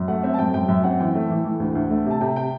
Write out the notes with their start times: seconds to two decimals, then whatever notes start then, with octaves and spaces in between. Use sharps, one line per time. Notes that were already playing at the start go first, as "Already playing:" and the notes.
Already playing: F#2
0.08 A3 F#5
0.23 C4 E5
0.34 A5
0.39 F#2 G5
0.54 F#2 G5
0.68 F#2 E5
0.84 C4 F#5
1.00 E3 G5
1.15 A3
1.30 E3
1.44 E3
1.60 D2
1.75 D2
1.90 A3
2.06 C3
2.11 A5
2.21 C3 G5
2.36 G5